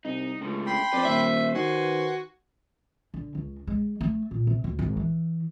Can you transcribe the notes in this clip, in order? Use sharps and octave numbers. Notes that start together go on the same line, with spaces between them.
C2 D#4
C#2 A2 D3
G5 B5 C6
F2 B4 C5 D5
D#1 E5
D#3 F#4 G#5 C6
D3
C#2
G#3
A3
A#2
C3
D2
G#1
E3